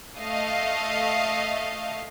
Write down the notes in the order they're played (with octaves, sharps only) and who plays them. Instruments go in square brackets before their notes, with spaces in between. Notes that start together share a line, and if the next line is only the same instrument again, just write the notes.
[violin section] A3 D#5 F5